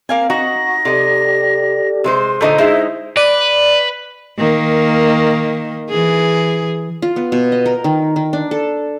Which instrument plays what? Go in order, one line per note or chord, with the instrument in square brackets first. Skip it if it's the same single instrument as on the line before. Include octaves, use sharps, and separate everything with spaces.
[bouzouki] A#3 F5 G#5 [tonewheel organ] C4
[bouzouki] D#4 [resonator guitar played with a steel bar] F#4 [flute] A#6
[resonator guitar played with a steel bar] C3 D#5 [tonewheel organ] G4 A4 D5
[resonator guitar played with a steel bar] C3 G#3 C5 [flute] C6
[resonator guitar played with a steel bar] A#2 D3 D#5 [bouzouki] A3 D#4 C5 [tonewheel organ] G6
[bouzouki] G#3 D#5 [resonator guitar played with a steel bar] D#4 E4 C5 [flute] E5
[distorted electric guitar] B4 [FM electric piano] D5
[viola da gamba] D#3 A#3
E3 G#4
[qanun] F4
B3
B2
D#5
A#4
D#3
D#3
D4
A4